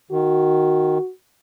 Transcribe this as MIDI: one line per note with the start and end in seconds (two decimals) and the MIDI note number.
0.11 0.98 51
0.11 1.10 66